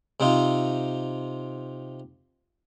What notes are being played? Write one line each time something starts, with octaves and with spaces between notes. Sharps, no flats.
C3 C4 D#4 F4